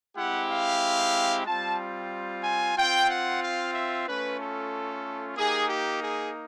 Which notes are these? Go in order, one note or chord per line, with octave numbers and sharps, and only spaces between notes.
G#3 C4 E4 G4 F#5
F5
G3 C4 F4 A5
G#5
C4 F4 G5
F#5
F5
E5
A3 C#4 F4 B4
A4
A#3 D#4 G4 G#4
G4
G#4